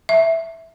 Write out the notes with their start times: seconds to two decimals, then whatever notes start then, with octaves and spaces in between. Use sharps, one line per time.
0.09 E5